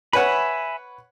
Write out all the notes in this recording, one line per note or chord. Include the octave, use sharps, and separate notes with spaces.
B4 C#5 E5 F#5 G#5 B5